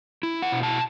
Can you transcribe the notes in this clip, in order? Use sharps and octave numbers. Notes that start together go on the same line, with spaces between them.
E4
F#5
B2
A5